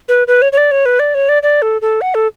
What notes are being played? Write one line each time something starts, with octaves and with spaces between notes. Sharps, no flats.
B4
B4
C#5
C#5
D5
C#5
B4
D5
C#5
D5
D5
A4
A4
F#5
A4